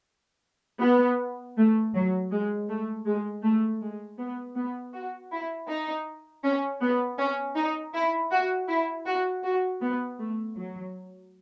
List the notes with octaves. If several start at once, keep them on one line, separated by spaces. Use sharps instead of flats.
B3
A3
F#3
G#3
A3
G#3
A3
G#3
B3
B3
F#4
E4
D#4
C#4
B3
C#4
D#4
E4
F#4
E4
F#4
F#4
B3
A3
F#3